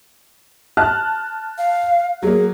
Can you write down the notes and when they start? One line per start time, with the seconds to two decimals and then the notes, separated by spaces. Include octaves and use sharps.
0.77 A5 F6 F#6
1.58 F5
2.23 F#3 A#3 G#4